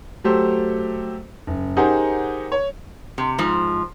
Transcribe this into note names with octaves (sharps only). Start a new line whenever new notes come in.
F#3 A3 G4 A4 C5
F#1
D#4 G4 G#4 A#4 C5 F#5
C#5
C3
G#2 F3